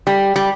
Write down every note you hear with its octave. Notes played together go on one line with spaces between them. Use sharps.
G3
G3